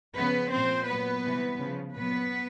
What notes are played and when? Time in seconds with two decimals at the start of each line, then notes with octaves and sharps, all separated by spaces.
0.16 C#3 F3 B3 B4
0.52 A#2 F3 C4 C5
0.88 A#2 F#3 B3 B4
1.24 C3 E3 G3
1.60 C#3 F3
1.95 A#2 F#3 B3 B4